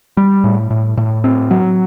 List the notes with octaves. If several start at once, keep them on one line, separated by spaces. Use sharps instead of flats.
G3
A2
A2
A2
C4
F#3